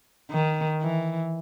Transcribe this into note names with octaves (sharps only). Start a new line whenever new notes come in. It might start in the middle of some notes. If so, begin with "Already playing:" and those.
D#3
E3